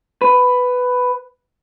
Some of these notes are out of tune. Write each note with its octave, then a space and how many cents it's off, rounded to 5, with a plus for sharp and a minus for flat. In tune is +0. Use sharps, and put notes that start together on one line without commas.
B4 +10